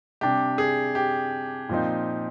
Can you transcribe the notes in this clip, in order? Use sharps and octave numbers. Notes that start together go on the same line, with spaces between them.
C3 G3 D4 G4
G#4
G4
A#2 F3 C4 D#4